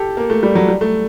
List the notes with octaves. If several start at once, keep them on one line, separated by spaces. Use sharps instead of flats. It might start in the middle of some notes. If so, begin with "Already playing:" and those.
Already playing: G4 A4
A#3
A3
G3
F#3
G3
A3